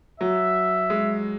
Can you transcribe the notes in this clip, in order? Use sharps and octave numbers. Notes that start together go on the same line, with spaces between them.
F#3 E5
G#3